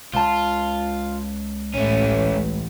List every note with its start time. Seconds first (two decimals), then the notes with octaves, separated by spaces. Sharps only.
0.14 C#2 F4 A5
1.74 A1 A3 C#4